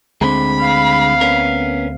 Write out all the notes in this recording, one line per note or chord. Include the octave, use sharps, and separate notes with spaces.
D2 D3 G#3 C4 B5
F5
B3 C#4 A#4